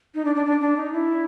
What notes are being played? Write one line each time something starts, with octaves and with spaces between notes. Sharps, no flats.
D#4
D4
D4
D4
D4
D#4
E4